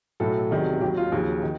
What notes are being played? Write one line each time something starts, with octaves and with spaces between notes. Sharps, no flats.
B1 A2 F#3 A4
E2 C3 D#3 F#3
D#2 D#3 F#3 G4
F4
D#2 C#3 F3 F#4
D#3